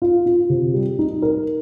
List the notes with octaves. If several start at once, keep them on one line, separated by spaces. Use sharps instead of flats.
F4
F4
C3
G3
D#4
A#4